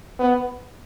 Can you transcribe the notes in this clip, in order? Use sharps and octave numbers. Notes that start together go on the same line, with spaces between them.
B3